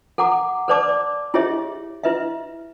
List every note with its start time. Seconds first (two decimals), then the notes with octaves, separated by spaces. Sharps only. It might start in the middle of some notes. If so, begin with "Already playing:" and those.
0.18 A4 F#5 A#5 D6
0.68 A4 B4 C5 D5 A5 D6
0.89 D5
1.34 E4 G4 G#4 C#5 D#5 E5
2.03 E4 B4 D#5 E5